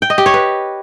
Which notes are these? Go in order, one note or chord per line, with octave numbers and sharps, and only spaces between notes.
G5
D#5
G4
C#5
B4